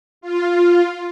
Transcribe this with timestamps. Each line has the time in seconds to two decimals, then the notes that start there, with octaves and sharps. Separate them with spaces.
0.21 F4